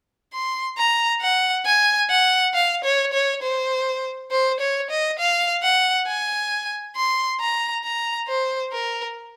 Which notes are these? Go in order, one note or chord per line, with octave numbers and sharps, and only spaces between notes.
C6
A#5
F#5
G#5
F#5
F5
C#5
C#5
C5
C5
C#5
D#5
F5
F#5
G#5
C6
A#5
A#5
C5
A#4